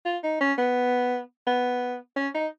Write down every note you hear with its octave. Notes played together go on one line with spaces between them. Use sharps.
F4
D#4
C#4
B3
B3
C#4
D#4